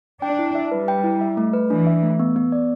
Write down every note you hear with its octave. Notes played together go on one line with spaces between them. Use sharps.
D4 G5
E4
E5
G3 B4
G5
E4
E5
A3
B4
E3 D4
E5
A3
B3
B3
D5